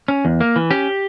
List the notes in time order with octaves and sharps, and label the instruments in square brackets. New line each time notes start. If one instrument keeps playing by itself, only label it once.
[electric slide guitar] C#4
E2
A#3
E3
C#4 G4